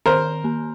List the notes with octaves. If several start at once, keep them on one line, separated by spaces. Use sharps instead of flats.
D#3 A#4 C5
A#3